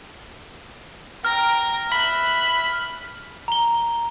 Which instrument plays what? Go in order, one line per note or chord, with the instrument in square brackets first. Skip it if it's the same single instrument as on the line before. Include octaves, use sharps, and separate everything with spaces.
[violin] G5 A#5 [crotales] F6
[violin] E5 F#6 [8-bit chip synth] B5
[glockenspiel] A#5 G7